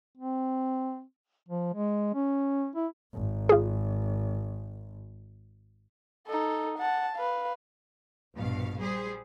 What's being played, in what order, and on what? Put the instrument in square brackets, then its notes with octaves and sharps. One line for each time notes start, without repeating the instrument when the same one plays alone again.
[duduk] C4
F3
G#3
C#4
E4
[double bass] G#1
[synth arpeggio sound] F4 G#4
[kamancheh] D#4 A4
F#5 A5
B4 F5
[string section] A#1 G2 B2 F5
G3 G#4 C5